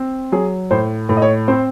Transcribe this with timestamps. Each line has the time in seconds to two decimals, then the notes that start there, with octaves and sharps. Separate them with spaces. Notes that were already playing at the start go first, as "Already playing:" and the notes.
Already playing: C4
0.32 F#3 G#4
0.71 A2 C5
1.09 A2
1.17 D#5
1.22 C#5
1.48 C4 C5